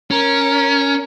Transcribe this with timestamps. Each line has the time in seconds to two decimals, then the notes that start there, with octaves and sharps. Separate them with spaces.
0.11 C#4 A#4